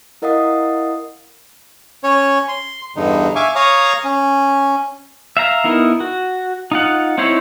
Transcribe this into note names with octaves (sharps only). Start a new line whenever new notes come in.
E4 A#4 D#5 F5 F#5 D#6
C#4 C#5
C6
E2 G2 D3 D#4
E5 F5 G#5 C#6 D6
C#5 F5 A#5 C#6 D#6
C#4
E5 F5 A#5
B3 D#4 E4 A#4
F#4
D#4 F4 F#5
C4 D#4 E4 C5 C#5